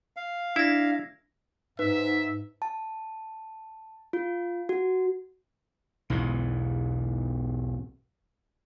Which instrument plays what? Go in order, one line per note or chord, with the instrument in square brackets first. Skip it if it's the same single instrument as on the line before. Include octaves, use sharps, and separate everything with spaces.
[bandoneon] F5
[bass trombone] D4 [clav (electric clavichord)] E4 [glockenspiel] G#6 A#6
[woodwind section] G#2 [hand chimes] D#4 [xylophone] B4 [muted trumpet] E5
[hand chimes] A5
F4
F#4
[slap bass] B1 E2 G#2 B2